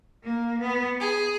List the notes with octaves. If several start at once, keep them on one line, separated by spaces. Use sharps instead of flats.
A#3
B3
G#4